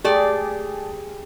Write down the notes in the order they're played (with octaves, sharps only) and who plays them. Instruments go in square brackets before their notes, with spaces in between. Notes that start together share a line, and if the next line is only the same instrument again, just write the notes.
[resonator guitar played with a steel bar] A3 D5 [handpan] G4 G#4